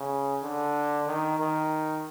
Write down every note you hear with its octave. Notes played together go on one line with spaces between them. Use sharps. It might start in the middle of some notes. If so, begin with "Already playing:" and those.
Already playing: C#3
D3
D#3
D#3